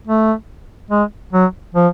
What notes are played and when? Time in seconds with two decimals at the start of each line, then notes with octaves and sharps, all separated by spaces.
0.07 A3
0.91 G#3
1.33 F#3
1.75 F3